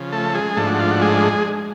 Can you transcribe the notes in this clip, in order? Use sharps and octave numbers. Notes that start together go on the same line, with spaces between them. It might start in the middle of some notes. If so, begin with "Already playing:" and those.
Already playing: C#3 F3
A3 A4
G#3 G#4
G#2 F3 A3 D4 A4
F#4
F4
F#4
G#3 G#4